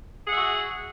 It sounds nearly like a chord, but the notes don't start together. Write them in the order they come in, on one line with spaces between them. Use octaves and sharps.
G#4 F#5 E5 F#4